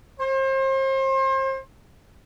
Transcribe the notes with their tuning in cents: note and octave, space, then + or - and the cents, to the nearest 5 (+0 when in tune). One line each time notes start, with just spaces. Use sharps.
C5 +35